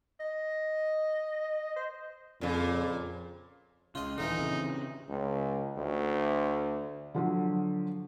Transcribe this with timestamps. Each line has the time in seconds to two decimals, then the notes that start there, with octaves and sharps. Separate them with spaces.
0.20 D#5
1.76 C5
2.41 F2 A#2 C#3
3.95 C#2 C#3 F4 D#5
4.18 D#1 D3 E3 F3 D#4
4.39 C#3 C4
5.09 C#2
5.77 D2
7.14 D3 F3 F#3